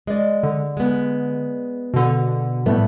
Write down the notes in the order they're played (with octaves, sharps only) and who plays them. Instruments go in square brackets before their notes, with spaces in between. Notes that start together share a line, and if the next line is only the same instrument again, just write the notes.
[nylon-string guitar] G#3 [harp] D5 D#5
[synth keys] D3
[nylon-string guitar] G#3 B3
[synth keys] B2 D3
[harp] A2 G3 A3 [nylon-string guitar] B3